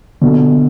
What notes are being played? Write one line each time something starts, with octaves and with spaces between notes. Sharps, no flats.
B2 D3